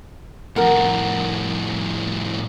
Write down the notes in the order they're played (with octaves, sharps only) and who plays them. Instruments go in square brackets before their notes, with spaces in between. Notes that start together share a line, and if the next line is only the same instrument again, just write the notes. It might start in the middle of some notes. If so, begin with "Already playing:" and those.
[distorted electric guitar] F2 A2 [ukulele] A#4 F#5